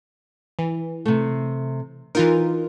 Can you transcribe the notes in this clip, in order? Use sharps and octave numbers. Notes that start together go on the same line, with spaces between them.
E3
C3 A3
E3 D#4 F4 A#4